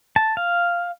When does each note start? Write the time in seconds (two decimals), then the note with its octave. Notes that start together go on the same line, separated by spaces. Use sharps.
0.16 A5
0.37 F5